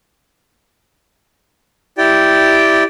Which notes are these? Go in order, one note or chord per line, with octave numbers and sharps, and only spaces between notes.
E4 G4 D5 G5